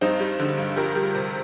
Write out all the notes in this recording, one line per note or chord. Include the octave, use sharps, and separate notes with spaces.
G2 C4 D#4
G3
D3
G2
F2 G4 A#4
G3 G4 A#4
C3